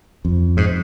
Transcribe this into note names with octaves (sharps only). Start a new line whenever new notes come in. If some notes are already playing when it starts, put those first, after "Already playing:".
F2
G#2